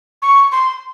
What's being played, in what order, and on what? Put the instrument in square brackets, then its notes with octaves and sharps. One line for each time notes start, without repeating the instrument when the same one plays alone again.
[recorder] C#6
C6